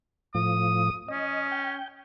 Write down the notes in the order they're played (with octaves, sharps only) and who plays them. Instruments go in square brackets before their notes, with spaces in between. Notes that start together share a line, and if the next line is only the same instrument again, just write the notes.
[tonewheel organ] A2 F3 [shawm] D#6
[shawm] C#4 [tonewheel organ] D#5
[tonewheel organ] G5